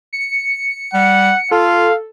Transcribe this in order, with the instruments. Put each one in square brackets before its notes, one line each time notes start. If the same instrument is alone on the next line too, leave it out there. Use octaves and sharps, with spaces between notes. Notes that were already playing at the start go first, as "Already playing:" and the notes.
[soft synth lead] C#7
[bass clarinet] G3 [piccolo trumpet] F#5
[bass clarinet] F4 [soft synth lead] A4 [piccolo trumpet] F5